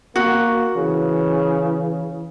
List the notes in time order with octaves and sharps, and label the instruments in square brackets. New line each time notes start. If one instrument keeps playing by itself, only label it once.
[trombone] A#3 [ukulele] F#4
[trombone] C#3 [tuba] E3